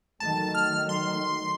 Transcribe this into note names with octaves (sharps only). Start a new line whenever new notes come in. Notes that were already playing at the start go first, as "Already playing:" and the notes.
D#3 F#3 A3 A5
F6
C6